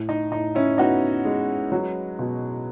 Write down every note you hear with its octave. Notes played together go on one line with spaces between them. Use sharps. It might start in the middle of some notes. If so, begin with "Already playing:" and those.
Already playing: A2
D#4
A2 D#4
C#4 E4
B3 D#4 F#4
G#3
F#3
B2